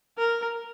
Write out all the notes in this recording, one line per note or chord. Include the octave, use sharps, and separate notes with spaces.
A#4